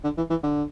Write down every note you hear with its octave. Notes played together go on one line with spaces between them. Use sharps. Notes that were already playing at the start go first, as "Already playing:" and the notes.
D3
E3
E3
D3